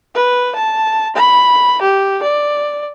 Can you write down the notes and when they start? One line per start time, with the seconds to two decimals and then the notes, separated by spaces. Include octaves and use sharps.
0.15 B4
0.55 A5
1.16 B5
1.82 G4
2.23 D5